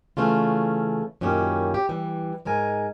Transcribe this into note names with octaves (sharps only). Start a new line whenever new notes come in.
C#3 E3 A3 C#4 F4
F#2 A#2 D#3 C#4 E4 G4
G4
E3 G3
G#2 G#3 A#4 G#5